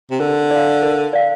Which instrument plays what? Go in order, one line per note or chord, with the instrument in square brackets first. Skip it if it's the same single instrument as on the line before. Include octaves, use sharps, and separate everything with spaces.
[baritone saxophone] C3
[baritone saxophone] D3 [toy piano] A#4
[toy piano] D5 F5
A#4
D5 F5